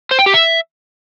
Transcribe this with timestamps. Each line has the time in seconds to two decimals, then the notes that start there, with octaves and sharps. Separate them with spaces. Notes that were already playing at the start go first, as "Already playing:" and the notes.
0.11 C5
0.19 G5
0.26 G4
0.34 E5